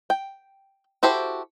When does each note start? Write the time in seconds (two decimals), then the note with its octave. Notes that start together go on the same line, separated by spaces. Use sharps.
0.10 G5
1.03 E4 F#4 G4 A4 C5